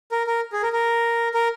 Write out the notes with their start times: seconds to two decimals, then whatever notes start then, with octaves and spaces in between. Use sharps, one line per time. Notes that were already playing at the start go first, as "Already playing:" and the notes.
0.12 A#4
0.27 A#4
0.53 G#4
0.63 A#4
0.73 A#4
1.34 A#4